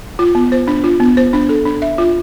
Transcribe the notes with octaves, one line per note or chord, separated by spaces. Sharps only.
F4
B3
C5
D4
F4
B3
C5
D4
A4
D4
E5
F4